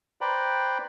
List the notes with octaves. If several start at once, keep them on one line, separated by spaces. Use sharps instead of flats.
B4 C5 D5 G5 A#5 B5